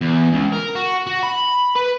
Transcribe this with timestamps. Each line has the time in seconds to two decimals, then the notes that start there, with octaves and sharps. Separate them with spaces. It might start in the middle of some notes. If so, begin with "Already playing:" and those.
0.01 E2
0.32 C#2
0.52 A#4
0.75 F#4
1.07 F#4
1.23 B5
1.76 B4